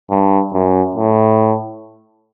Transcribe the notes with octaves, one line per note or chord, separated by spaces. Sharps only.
G2
F#2
A2